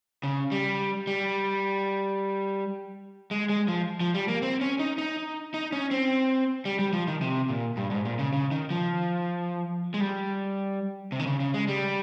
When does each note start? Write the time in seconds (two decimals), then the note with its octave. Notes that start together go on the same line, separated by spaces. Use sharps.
0.23 C#3
0.52 G3
1.07 G3
3.31 G#3
3.49 G#3
3.68 F3
4.00 F3
4.14 G3
4.28 A#3
4.42 C4
4.61 C#4
4.79 D#4
4.98 D#4
5.54 D#4
5.72 C#4
5.91 C4
6.65 G3
6.79 G3
6.93 F3
7.07 D#3
7.21 C3
7.49 A#2
7.77 G2
7.91 G#2
8.05 A#2
8.19 C#3
8.33 C#3
8.51 D#3
8.70 F3
9.94 G#3
10.00 G3
11.12 C3
11.19 D#3
11.26 C#3
11.40 C#3
11.54 G#3
11.68 G3